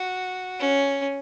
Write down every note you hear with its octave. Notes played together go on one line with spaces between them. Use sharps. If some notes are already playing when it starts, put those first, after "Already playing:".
Already playing: F#4
C#4